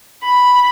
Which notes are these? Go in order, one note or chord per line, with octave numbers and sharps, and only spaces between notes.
B5